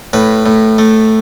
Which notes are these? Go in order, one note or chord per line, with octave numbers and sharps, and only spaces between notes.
A2 B4
A2
A3